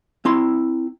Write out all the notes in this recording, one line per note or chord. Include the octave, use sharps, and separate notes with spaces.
C4 E4 C6